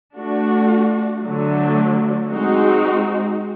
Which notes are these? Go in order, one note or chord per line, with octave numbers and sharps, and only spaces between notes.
A3 D4 F#4
D3 F#3 A3
G#3 C4 D#4 F#4